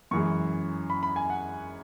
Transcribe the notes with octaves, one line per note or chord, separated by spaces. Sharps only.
F#2 E3 G#3 C#6
B5
B5
G#5
F#5